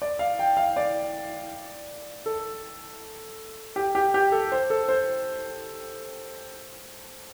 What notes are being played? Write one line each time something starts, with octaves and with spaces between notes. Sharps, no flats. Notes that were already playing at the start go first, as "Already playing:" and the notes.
D5
F5
G5
F5
D5
A4
G4
G4
G4
A4
C5
A4
C5